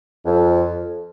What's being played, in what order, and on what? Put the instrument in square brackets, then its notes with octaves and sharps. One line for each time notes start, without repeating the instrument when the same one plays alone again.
[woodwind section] F2